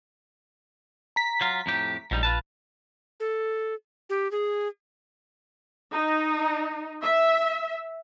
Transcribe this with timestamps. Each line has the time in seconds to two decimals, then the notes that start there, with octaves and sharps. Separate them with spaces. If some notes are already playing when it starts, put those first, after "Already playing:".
1.16 A#5 B6
1.41 F#3 F4
1.66 F2 A2 G4
2.11 A#1 G#2 G3 D#4
2.23 F4 B4 A5
3.20 A4
4.10 G4
4.31 G#4
5.92 D#4
7.02 E5